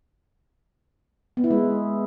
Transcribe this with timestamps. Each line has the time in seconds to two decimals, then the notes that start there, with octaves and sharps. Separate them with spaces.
1.37 B3
1.44 E4
1.51 G#3